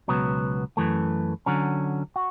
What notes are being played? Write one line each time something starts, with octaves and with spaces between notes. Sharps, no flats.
C#2 B2 F#3 B3
F#2 E3 A3
D3 F#3 C#4
F#4